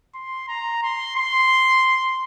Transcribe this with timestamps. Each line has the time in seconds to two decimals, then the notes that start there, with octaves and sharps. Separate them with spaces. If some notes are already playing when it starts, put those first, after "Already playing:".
0.14 C6
0.48 A#5
0.82 C6
1.16 C6